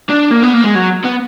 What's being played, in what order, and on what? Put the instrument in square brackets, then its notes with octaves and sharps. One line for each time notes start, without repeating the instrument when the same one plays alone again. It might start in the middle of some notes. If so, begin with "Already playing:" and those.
[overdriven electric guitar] D4
A#3
B3
A#3
G#3
F#3
B3